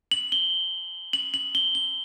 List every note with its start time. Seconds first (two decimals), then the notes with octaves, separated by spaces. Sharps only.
0.12 F#7
0.32 G7
1.13 F#7
1.34 F#7
1.55 G7
1.75 G7